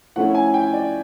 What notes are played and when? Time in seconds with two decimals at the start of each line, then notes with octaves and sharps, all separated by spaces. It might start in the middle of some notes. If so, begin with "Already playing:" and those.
0.16 F3 A3 C#4 E4 F#5
0.35 G#5
0.54 G5
0.73 D5